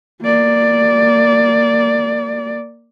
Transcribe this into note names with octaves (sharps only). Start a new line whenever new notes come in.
A#3 D5